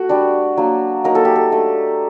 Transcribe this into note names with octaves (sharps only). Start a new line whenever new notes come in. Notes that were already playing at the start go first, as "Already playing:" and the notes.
Already playing: A3 F#4
G3 D4
F#3 A#3 D4
F#3 A#3 D#4 A#4
A4
G4
A4
A3 D4